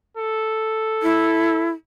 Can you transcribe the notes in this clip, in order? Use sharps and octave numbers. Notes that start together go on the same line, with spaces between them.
A4
E4